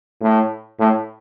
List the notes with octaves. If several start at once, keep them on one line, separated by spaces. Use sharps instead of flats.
A2
A2